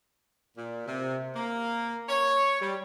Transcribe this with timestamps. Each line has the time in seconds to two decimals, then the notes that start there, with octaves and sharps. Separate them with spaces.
0.57 A#2
0.87 C3
1.35 A#3
2.08 C#5
2.61 G3